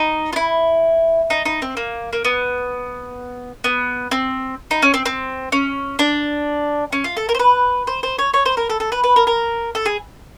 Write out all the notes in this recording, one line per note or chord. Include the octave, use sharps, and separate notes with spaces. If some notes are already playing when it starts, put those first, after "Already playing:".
Already playing: D#4
F4
E4
D#4
D#4
C4
A#3
A#3
B3
B3
C4
D#4
C#4
C4
C4
C#4
D4
C#4
F4
A4
A#4
C5
B4
C5
C5
C#5
C#5
C5
A#4
A4
A4
B4
B4
A#4
A#4
A4
G#4